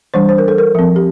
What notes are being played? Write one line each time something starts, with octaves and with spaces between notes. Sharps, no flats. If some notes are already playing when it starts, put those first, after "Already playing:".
E3 G3 D4 C5
C5
A#4
A4
A#4
F3 C4
G4